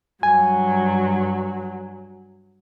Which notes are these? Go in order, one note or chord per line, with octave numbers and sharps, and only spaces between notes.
G2 F#3 G#5